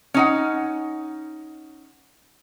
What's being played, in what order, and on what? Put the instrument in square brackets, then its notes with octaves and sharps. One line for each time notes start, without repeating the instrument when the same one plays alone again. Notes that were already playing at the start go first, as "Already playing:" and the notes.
[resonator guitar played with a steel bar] C#4 D#4 F#5